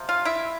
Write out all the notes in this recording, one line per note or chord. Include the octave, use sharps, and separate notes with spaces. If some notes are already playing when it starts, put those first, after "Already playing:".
Already playing: C3 F3
F4 F5
E4 E5